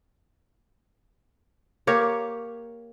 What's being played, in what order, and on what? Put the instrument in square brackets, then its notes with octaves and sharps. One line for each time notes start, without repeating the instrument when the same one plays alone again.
[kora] A#3 G4 A#4 C#5